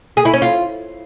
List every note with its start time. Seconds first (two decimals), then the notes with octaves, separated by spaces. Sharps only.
0.17 G#4
0.25 E4
0.34 C#4
0.42 F4